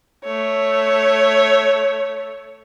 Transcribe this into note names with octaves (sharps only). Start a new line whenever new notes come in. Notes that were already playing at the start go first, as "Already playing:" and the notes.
A3 C#5